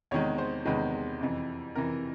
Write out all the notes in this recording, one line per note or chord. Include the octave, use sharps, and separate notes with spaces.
E2 C3 D#3 G#3 C#5
C5
E2 C3 D#3 G#3 B4
F2 C3 E3
F2 C3 E3 A#4